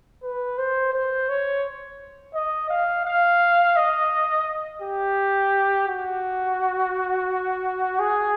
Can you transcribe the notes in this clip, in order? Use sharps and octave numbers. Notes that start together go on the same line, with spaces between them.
B4
C5
C5
C#5
D#5
F5
F5
D#5
G4
F#4
G#4